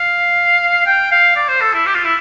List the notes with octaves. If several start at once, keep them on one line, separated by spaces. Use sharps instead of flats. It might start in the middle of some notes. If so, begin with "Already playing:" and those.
Already playing: F5
G5
F5
D5
C5
A4
E4
G4
F4
E4